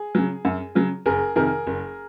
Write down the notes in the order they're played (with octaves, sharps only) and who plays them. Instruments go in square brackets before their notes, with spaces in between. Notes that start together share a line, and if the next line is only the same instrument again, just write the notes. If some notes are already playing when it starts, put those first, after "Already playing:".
Already playing: [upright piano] G#4
C#3 F#3
F#2
C#3 F#3
F#1 G#4 A#4
F2 C3 D#3 G#4 A#4
F#1